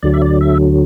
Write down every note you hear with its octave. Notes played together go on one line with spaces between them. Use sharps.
D2 D3 F#3 D5
E5
D5
E5